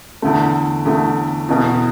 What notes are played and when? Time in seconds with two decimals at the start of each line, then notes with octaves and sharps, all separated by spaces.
0.22 E2 D3 A3
0.86 E2 D3 A3
1.49 E2 B2 B3